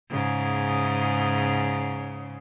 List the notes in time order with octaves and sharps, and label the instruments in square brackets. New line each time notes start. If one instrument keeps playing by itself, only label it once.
[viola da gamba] G#2 C#3